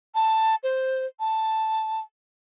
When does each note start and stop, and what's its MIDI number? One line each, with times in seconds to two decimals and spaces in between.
0.15 0.56 81
0.63 1.06 72
1.20 2.00 81